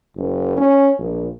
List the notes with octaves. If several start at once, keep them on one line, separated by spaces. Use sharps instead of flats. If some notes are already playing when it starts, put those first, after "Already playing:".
F#1
C#4
A#1